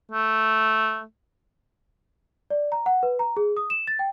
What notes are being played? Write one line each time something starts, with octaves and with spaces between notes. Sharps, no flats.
A3
D5
A#5
F#5
B4
A#5
G#4
D#6
E7
A6
G5